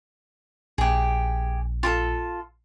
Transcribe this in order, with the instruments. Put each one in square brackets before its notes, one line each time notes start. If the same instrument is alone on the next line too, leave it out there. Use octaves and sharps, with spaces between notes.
[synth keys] A#1 [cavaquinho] G4 G#4
[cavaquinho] F4 G4 A4